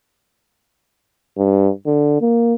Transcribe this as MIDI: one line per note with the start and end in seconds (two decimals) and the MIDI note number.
1.38 1.71 43
1.86 2.17 50
2.21 2.54 58